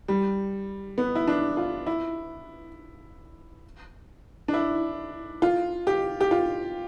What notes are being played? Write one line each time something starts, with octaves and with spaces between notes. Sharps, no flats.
G3
B3
E4
D4
F4
E4
D4
E4
F4
G4
G4
F4